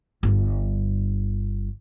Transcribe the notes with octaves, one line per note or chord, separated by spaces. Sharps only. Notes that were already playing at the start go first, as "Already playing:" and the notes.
G1 G2